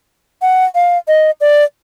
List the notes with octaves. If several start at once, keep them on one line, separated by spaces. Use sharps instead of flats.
F#5
F5
D#5
D5